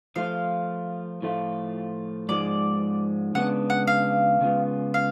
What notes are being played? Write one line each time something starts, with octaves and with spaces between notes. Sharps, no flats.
F3 A3 F4 F5
A2 F3 A3 F4
G#2 F3 G#3 D5
C#3 G#3 B3 D4 F#5
F#5
F5
C#3 G#3 B3 F4
F5